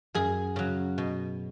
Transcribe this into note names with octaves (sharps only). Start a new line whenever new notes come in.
F#2 G#4
C#3 F#3
B2